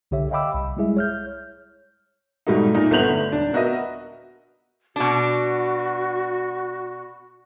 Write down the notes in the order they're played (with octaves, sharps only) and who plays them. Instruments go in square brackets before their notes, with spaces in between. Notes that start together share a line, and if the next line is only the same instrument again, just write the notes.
[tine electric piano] C2 D3 G4 C#5 E5
D#5 F5 G5 B5 D6 E6
C2
G3 G#3 E4 G#4 E5
C#5 F6 G6
[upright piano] G#2 B2 G3 A3 D#4
A#2 D#4
G1 A3 B3 G6 F7 F#7
D3
D#1 D4
B3 F#4 A#4 B4 D#5 E5
[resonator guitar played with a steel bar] B2 D4 [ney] F#4